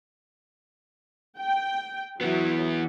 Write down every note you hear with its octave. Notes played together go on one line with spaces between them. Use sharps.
G5
E3 F#3 B3